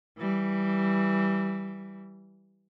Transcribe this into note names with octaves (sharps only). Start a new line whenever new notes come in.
E3 G3